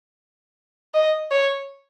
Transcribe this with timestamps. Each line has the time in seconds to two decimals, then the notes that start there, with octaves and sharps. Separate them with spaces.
0.94 D#5
1.31 C#5